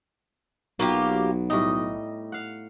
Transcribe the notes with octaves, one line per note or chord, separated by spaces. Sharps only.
B1 F#3 A#3 B3 F4 G4
A2 G3 D#4 D#5
F5 F#5